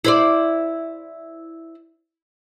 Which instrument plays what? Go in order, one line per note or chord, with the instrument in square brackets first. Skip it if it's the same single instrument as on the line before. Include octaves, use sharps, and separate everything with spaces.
[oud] E4 C5 D5